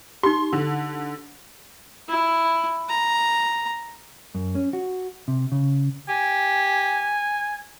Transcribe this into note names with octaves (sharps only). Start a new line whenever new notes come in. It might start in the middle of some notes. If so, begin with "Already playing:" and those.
D#4 G4 C6
D3
E4
A#5
F#2
C#4
F#4
C3
C#3
G4 G#5